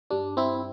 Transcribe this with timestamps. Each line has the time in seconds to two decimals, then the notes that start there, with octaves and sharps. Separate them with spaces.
0.10 G2 G3 D4
0.37 C4 E4